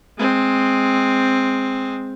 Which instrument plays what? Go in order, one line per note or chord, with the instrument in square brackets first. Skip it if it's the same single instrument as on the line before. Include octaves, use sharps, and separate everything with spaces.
[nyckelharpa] G#3 C4